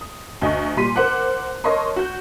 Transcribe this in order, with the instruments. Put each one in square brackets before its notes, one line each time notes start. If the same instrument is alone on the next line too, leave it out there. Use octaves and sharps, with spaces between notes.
[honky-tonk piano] D#6
D2 D#5 C#6
A#2 G3 C6 B6 D#7
A#4 C5 F#5 D6 F#6
A#4 C#5 D#5 A5 C6 C#6
F#4 G6